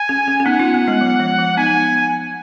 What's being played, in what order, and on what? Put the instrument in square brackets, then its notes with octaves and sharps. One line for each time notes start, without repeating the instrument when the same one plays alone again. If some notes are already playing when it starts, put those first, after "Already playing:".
Already playing: [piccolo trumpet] G#5
[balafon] C#4
C#4
C#4
[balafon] B3 D#4 [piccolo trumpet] F#5
[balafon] C#4 F4
B3
G#3
F#3
F3
F3
[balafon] B3 D#4 [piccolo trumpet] G#5